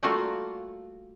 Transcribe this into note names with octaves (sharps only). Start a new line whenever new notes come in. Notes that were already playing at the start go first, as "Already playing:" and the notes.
G3 A3 A#3 F4 F#4 F5